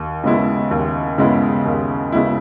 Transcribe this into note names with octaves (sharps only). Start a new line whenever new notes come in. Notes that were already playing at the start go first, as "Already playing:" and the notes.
Already playing: D#2
C#3 G#3 B3 E4
D#2
C#3 G#3 B3 E4
D#2
C#3 G#3 B3 E4